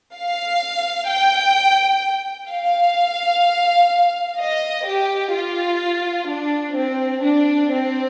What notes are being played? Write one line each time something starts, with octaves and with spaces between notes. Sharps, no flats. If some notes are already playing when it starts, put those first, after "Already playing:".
F5
G5
F5
D#5
G4
F4
D4
C4
D4
C4